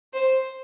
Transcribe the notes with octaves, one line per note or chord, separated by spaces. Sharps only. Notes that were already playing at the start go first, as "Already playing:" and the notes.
C5